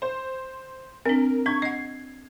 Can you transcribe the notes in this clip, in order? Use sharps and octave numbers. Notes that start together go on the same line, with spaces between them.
C5
C4 D4 A#4
D4 C#6 G#6
D#5 F#5 C7